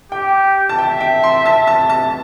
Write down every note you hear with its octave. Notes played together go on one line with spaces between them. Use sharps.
G4 G5
A5
E5 G5
G5
C6
A5
A5
A5